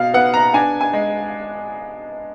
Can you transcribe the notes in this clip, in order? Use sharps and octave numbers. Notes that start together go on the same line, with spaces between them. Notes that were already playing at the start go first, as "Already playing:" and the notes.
Already playing: B2 F5
B3 F#5
A#5
D4 G#5
G#5
G#3